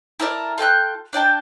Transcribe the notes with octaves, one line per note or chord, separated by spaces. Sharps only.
E4 A4 A#4 D5
F4 A4 G5 F#6
D4 D5 G5 A5